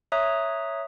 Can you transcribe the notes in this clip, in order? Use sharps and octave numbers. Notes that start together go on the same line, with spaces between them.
C#5 E5 A#5 D#6 F#6